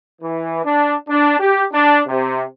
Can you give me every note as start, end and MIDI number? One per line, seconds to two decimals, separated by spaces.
0.22 0.61 52
0.65 0.94 62
1.09 1.37 62
1.40 1.64 67
1.73 2.01 62
2.08 2.43 48